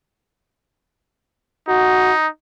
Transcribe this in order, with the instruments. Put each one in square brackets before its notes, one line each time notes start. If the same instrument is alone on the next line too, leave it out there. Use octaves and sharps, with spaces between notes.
[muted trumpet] D#4 [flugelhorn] F#4